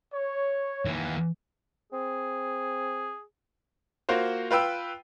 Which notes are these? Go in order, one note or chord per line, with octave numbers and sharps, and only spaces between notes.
C#5
D#2 E3
C4 G#4
A#3 F4 F#4 C5
F4 B4 G5 E6